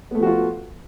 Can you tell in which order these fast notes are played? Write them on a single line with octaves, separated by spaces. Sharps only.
B3 A3 F3 F#4 F4